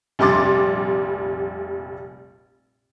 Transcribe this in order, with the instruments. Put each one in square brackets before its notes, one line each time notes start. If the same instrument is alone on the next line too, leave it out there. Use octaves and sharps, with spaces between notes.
[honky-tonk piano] F1 A#1 G3 C6 D6 A6